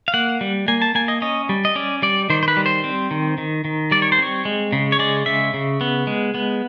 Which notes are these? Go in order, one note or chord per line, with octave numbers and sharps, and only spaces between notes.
F5
A#3 F#5
G3
A#3 G#5
A5
A#3 G#5
D#5
C#4 D#5
G3
D#5
C#4 D5
G3 D5
D#3 C5
C5
B4
G3
C5
C4
D#3
D#3
D#3
G3 D5
C#5
C5
C4 C#5
G#3
C#3
C#5
G#3 D5
C#3 E5
C#3
B3
G#3
B3